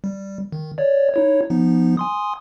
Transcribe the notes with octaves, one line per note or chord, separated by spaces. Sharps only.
G3
D#3
C#5 D5
D#4 E4 C#5
F3 B3 D#4
G#5 C6 D#6